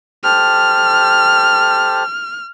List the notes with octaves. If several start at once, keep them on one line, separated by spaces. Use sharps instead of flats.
G4 A4 C5 F6